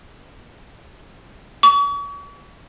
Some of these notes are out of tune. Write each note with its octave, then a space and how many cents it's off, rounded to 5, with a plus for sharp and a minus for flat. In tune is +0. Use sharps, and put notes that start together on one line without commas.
C#6 +40